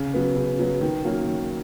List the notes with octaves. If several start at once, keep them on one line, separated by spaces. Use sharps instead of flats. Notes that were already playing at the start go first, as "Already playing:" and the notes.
Already playing: C#3
F#3 B3
C#3
F#3 B3
D#3
F#3 A#3 C#4
D#3